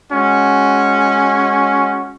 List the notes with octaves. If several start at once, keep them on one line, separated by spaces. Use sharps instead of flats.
G#3 C#4 F#4